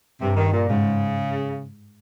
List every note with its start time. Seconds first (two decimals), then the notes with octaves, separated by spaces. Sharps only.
0.21 G2 C3
0.37 D#3
0.53 A#2
0.69 G#2 C#3